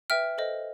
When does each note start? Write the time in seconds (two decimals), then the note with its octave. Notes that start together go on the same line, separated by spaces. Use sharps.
0.10 B4 E5 G5 F6
0.38 A4 C5 D#5